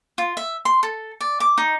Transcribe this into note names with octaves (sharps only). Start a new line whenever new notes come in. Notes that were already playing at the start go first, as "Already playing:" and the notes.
F4
E5
C6
A4
D5
D6
D#4